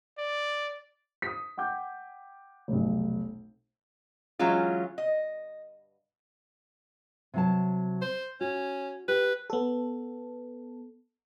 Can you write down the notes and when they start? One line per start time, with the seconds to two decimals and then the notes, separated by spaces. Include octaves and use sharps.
0.18 D5
1.22 D#6 B6
1.57 F#5 G5 D6 G6
2.68 F1 B1
4.39 E3 F#3 G#3 C#4 F4
4.98 D#5
7.34 C3 F#3 A5
8.02 C5
8.41 C#4 F#4
9.08 G4 B4
9.50 B3 A4